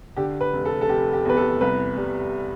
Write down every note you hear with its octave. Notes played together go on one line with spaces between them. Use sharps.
D3 G4
B4
F1
A4
A4
F1 G4
G4
E2 B4
A4
C2 B4
G3